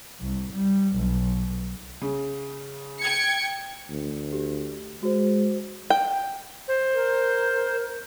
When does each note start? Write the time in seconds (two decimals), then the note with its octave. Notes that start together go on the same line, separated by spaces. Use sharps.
0.21 C2
0.52 G3
0.96 B1
2.02 C#3
2.99 G5 G#6 C#7
3.89 D2
4.33 G4
5.03 G#3 F#4 C5
5.90 G5
6.68 C5
6.94 A#4